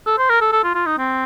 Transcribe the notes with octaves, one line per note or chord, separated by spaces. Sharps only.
A4
C5
A#4
A4
A4
F4
F4
D#4
C4